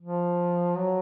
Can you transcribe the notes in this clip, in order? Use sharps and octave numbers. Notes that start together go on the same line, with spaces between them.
F3
F#3